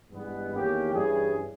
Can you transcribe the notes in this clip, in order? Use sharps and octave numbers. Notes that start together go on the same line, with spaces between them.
G2 E3 G#3 B3
E2 D#3 A#3 C#4 G4
G2 E3 G3 C#4 G#4